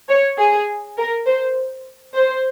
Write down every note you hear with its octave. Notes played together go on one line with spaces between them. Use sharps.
C#5
G#4
A#4
C5
C5